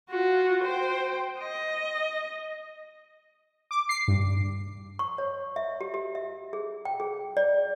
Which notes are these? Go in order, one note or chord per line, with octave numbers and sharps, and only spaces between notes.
F4 F#4
C5 G5
D#5
D6
C7
G2
C#6
C#5
E5
G4
G4
E5
G#4
G5
G#4
D5